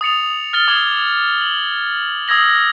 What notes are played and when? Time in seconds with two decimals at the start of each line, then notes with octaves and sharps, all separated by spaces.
0.01 D#6 A6 C#7 F7
0.53 F6 A6 G7
0.68 D6 D#6 G#6 G7
1.41 F#7
2.28 D#6 E6 G#6 A#6 F#7
2.52 G7